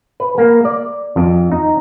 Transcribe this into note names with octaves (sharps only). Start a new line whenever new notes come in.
B4
A#3
D5
F2
D#4